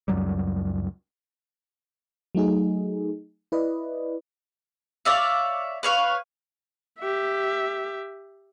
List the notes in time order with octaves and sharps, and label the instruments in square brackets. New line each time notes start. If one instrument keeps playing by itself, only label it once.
[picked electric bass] C#2 F#2 F#3 G3
[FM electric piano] F#3 A3 D#4 G#4
E4 B4 D5 D#5
[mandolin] C#5 D5 E5 F5
B4 C#5 F5
[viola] G4 E5